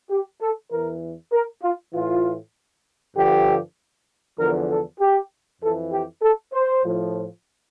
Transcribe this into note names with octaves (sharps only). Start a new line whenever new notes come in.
G4
A4
E2 E3 A#4
A#4
F4
A2 E3 F4
G2 D3 F3 G4
E2 D3 F3 A#4
A4
G4
F2 E3 A4
G4
A4
C5
A2 F3